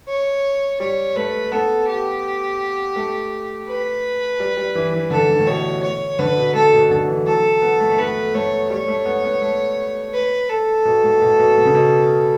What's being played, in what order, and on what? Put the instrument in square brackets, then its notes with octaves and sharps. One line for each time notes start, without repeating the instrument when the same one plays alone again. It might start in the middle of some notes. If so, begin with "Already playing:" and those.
[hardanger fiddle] C#5
[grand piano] G3 [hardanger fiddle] C#5
[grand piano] A3 [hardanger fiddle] B4
[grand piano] B3 [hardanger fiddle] A4
[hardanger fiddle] G4
[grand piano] A3
[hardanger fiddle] B4
[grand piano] G3
G3
E3
E3
[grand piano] D3 [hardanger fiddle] A4
[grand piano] D3
A2
[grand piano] B2 [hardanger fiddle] C#5
[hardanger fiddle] C#5
[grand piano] D3 [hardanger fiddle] B4
[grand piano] B2
[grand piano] A2 [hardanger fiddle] A4
[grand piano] B2
D3
E3
[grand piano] F#3 [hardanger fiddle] A4
[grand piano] B3
A3
A3
[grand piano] B3 [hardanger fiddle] B4
[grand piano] A3 [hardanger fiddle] C#5
[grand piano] G3 [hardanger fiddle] C#5
[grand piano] A3
B3
B3
A3
[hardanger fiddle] B4
A4
[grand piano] B2
A2
B2
B2
B2
C#3
B2